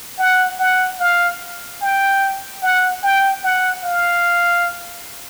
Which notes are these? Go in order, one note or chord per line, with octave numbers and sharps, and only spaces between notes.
F#5
F#5
F5
G5
F#5
G5
F#5
F5